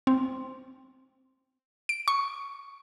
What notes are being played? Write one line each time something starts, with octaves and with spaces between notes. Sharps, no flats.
C4
D7
C#6